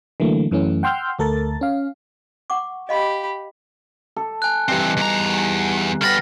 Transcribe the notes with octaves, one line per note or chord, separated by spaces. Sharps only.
D3 E3 F#3 A3 A#3
F#2 E3 A3 C#4
F#5 G5 C6 E6 F6 G6
D2 A3 A4 A#4 A6
C#4 F5
F#5 C#6 D6
G4 D#5 F5 B5 C6
A4
G#5 F#6
G2 E3 C4 D#4 D6
E2 A#5
D3 B3 G5 A#5 B5 F6 A6 A#6